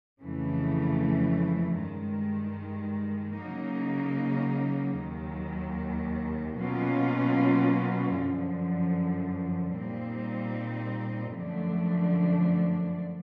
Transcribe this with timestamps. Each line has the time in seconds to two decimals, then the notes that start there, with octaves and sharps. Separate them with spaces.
0.20 F2 C#3 E3 A3
1.80 G2 D#3 G#3
3.39 C#3 F#3 A#3 D#4
4.98 D#2 D#3 F#3
6.57 B2 F#3 A#3 C#4 F4
8.17 F#2 D3 F3
9.77 A#2 G3 C4 D#4
11.36 F#2 D3 F3 A3 D4